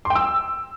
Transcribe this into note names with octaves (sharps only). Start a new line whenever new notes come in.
C6
G5
E6